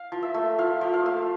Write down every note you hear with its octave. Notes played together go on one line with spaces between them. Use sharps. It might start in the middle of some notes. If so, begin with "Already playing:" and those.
Already playing: F5
F3
E5
A3
F3 F5
F3
F5
A3